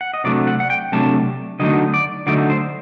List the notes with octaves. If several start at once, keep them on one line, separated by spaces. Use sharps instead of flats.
F#5
D#5
C3 F#3 A3 D4 D5
F#5
F#5
G5
C3 F#3 A3 D4 A5
D3 F#3 A3 D#4 D#5
D5
D3 F#3 A3 D#4 D5
C5